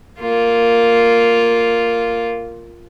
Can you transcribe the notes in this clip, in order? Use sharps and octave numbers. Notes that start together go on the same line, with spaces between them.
A#3 F4